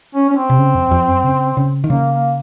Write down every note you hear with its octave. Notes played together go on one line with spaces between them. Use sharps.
C#4
C#4
C4
C3
C#3
F2
F2
F#2
C#3
C#3
D#3
C#3 A#3
A#3